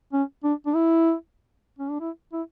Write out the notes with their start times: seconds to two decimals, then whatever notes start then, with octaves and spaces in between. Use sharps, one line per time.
0.13 C#4
0.44 D4
0.66 D4
0.75 E4
1.79 C#4
1.91 D4
2.01 E4
2.33 E4